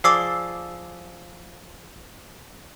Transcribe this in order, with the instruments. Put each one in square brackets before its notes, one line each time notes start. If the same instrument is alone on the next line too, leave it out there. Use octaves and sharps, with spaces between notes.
[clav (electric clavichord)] F3 G#4 D5 [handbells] D6 E6 C7